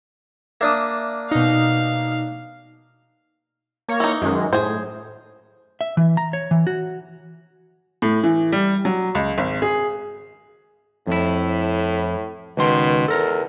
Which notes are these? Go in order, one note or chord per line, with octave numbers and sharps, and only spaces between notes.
A#3 D4 E5 D#6
B2 D#4 F5
A#3 C#5 A#6
E3 D#4
F#2 D#3 G#3
A2 G#4 C5
E5
E3
A#5
C#5
E3
F#4
A2
E3
G3
F#3
C#2
G#1
G#4
F2 A2 E4
C#2 B2 D#3 C6
E2 A4 A#4